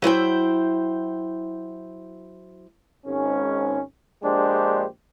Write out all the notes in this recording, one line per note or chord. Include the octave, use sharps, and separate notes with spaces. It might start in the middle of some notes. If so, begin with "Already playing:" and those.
F#3 E4 C5 G5
G#1 G#2 C#4
A#1 G#3 D4 G4 C5